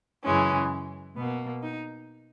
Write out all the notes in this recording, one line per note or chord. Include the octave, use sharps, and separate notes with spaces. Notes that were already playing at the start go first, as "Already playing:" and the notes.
F#2 C#3 E3 G#3 C#4
B2 A#3 B3
D#4